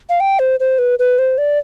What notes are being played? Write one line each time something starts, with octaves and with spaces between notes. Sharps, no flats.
F5
G5
C5
C5
B4
B4
C5
D5